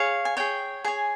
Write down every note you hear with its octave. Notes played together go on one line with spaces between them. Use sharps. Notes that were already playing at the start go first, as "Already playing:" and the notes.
Already playing: G#4 C#5 F5
G#5
G#4 C#5 G5
G#4 C#5 G#5